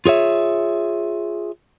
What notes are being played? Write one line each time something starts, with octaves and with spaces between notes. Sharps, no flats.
F4 G#4 C#5 E5